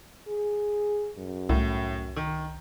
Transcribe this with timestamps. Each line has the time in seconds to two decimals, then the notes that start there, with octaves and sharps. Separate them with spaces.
0.28 G#4
1.18 F#2
1.49 C2 A2
2.16 D#3